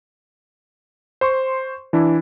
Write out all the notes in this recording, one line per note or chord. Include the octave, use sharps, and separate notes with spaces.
C5 C6 C#6
E3 D4 E4